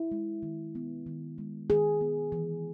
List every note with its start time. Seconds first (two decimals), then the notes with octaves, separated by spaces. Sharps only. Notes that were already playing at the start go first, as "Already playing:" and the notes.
Already playing: E4
0.12 G#3
0.43 D#3
0.75 B3
1.07 D#3
1.38 G#3
1.70 D#3 G#4
2.01 B3
2.32 E3